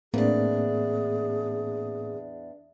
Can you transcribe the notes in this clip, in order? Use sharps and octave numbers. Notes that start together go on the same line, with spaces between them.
E2 A2 A#3 C4 D4 G#4